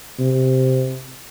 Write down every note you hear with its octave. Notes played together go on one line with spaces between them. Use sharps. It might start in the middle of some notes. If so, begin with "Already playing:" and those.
C3